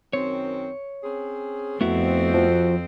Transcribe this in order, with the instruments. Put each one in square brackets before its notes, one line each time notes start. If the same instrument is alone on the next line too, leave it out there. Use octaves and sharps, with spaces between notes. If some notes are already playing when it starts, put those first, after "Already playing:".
[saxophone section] F#2 D#3 C4 [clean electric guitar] C#5
[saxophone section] C4 C#4 G#4
[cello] F2 C4 [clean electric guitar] A3 B3 E4 [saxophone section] F#4
[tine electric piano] F3